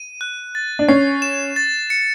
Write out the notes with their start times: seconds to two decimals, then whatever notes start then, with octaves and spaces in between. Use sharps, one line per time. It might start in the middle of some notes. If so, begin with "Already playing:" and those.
Already playing: D#7
0.21 F#6
0.55 A6
0.79 D4
0.88 C#4 C7
1.22 E7
1.56 A6
1.90 C#7